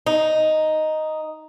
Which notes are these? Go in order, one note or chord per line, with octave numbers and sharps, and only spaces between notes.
D#4